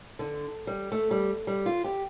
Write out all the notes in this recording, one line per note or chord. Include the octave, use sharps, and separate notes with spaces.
D3
G3
A3
G3
G3
F4
G4